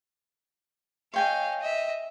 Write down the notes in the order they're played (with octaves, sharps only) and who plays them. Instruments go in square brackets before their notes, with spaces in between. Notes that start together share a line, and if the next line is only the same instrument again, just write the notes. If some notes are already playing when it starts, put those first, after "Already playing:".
[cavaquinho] C#5 G5 G#5 [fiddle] D#5 F5
[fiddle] D#5 E5